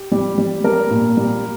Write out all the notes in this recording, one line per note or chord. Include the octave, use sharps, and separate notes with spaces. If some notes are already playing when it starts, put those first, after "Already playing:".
Already playing: G4
G3
G3
G3 A#4
A#2
G3